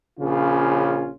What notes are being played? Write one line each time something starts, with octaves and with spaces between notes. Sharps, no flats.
A#1 C#3 C#4 F4